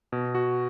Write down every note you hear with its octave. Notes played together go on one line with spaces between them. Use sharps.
B2
F#4